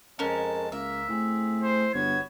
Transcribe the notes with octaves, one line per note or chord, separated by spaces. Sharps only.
F2 G#3 C#4 A#4 A5
C#2 A#3 A#4 E5
A2 C4 G#4
C5
G1 B3 F#4 C#5 G#6